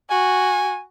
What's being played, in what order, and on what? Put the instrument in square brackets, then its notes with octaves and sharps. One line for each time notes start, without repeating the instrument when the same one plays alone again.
[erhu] F#4 [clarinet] G#5